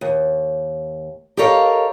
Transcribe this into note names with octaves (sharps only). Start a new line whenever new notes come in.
D#2
G4 A4 A#4 C#5 D#5 F5